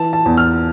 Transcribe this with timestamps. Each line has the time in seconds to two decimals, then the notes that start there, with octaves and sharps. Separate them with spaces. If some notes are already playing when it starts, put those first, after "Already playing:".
Already playing: E3 A5
0.13 A5
0.26 E2
0.37 F6